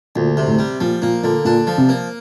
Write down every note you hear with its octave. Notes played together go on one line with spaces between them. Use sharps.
D2 A#2
C3
A2
G3
A#2 F3
A#2 A#3
A#2 D3
A#2 D4
F3
C3
A#3